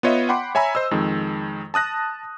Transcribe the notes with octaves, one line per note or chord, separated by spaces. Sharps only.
B3 F4 C#5 D#5 E5
F#5 G5 B5 C6 D6
C#5 E5 G#5 A#5 B5 E6
C5 D#5 E6
F2 D#3 G#3
A5 D#6 F#6 A#6